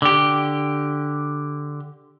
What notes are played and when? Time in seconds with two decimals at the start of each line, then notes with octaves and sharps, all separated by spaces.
0.02 D3 G4